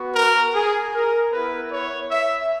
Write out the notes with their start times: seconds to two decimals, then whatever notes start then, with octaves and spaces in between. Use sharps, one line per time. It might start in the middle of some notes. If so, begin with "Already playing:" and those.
Already playing: B3 F#4
0.15 A#4
0.54 G#4
0.93 A#4
1.32 B3 E4 B4
1.72 C#5
2.11 E5